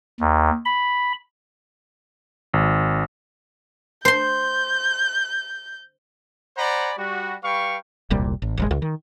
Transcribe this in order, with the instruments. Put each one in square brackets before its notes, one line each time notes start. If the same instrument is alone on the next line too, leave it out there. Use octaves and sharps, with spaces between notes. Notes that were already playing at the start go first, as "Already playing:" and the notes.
[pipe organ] D#2
B5
[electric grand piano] G#1
[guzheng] C5 C6 [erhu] G6
[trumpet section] C5 D5 F#5 G#5 A#5 B5
G3 F#4
G3 B4 F5 G5 C#6
[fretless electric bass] E1 C2 A#2 G3
A1
E1 A1 G#3
C#2
D#3